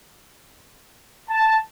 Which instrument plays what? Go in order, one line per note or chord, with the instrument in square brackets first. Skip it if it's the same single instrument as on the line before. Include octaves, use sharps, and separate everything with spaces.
[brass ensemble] A5